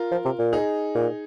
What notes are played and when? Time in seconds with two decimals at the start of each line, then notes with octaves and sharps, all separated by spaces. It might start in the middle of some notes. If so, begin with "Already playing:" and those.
Already playing: F4 A#4
0.11 F3
0.25 C3
0.39 A#2
0.53 D#4 G#4
0.95 A#2